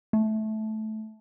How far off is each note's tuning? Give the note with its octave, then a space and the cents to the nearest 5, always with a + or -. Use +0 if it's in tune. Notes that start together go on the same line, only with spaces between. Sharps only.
A3 -15